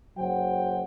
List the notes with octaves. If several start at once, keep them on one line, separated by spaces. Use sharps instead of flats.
F#1 F#3 C5 F#5 G5